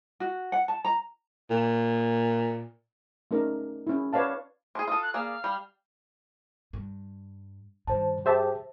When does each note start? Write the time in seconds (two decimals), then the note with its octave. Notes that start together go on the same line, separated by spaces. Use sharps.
0.20 F#4
0.52 F#5
0.68 A5
0.85 A#5
1.50 A#2
3.31 A3 C#4 D#4 A#4 D5
3.87 C#4 E4
4.13 B4 C#5 D5 F5 A5
4.75 D4 G#4 C6
4.88 F4 A4 D#6
5.02 F#6
5.14 A#3 G#4 D5 F5
5.44 G3
6.73 G2
7.87 G2 D#3 C5 A5
8.26 G4 G#4 C5 E5 A5